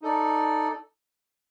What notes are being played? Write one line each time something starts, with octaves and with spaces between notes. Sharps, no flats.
D#4 A4 D5